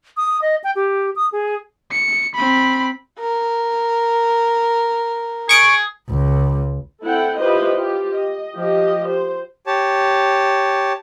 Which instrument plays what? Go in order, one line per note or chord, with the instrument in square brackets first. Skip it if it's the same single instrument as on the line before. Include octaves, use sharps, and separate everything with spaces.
[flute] D#6
D#5
G5
G4
D#6
G#4
[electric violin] C#7
C4 B5
[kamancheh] A#4
[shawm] G#4 [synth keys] C#6 D7
[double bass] C#2
[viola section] C4 E4 A4 F#5 G5
E4 F4 G4 B4 C5 D#5
F4 G4
D#5
F3 G4 D#5
C5
[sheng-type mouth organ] G4 C#5 A5